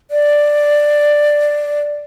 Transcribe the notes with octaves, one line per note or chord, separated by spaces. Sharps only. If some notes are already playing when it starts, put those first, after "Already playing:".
D5